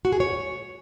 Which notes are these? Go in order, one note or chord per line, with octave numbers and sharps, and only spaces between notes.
F#4
G#4
C#5